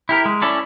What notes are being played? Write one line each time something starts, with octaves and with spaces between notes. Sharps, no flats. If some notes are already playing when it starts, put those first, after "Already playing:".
E4 G4 A#4
G#3
C#4 E4 A4 D5